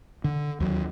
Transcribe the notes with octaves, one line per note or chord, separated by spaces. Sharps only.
D3
D#2 F#3